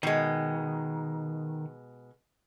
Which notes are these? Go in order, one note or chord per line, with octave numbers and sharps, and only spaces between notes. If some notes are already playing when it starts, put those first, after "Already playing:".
B2 D#3 G#3